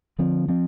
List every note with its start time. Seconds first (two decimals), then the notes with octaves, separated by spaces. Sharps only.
0.19 D3 F3 C4
0.48 F3 C4